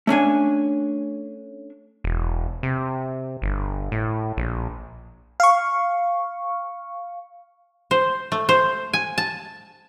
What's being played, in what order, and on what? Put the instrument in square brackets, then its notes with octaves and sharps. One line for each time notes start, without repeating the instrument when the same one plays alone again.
[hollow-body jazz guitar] A3 C#4 D4 G#5
[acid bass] E1
C3
G1
A2
A#1
[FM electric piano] F5 C#6
[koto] C5
A3
C5
G#5
A5